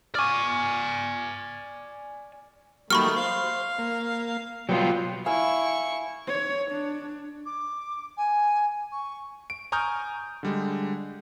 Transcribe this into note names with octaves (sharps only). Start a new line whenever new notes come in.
D5 G#5 C#6 D6 F6
D#3 F#3 G3 A3 A#3 B5 C#6 F6
C5 F5
A#3
B2 F#3 G3 B3 F4 G5
E4 F5 G#5 C#6 E6
C#5
D4
D6
G#5
C#6
D7
G#5 A#5 C#6 D#6 F6 G6
D3 G3 G#3